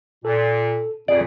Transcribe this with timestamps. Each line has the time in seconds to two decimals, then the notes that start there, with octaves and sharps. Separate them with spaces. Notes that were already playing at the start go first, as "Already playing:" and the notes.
0.25 A#2 A4
1.08 F2 A#2 G#4 D5